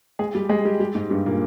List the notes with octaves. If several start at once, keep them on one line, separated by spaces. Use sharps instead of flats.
G#3 G#4
G3 G4
G#3 G#4
G3 G4
G3 G4
G#2 G#3
G2 G3
A#2 A#3